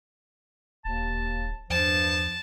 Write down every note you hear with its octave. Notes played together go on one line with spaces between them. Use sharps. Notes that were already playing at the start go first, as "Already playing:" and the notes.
D1 D#2 A5
E2 G2 F3 A5